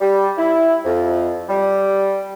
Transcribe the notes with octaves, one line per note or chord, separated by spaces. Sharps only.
G3
E4
F2
G3